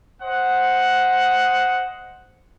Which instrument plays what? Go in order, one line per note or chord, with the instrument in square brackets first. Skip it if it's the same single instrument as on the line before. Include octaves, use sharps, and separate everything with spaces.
[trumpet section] C5 D#5 F#5